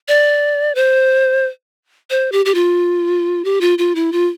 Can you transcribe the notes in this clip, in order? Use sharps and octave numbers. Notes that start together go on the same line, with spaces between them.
D5
C5
C5
G4
G4
F4
G4
F4
F4
E4
F4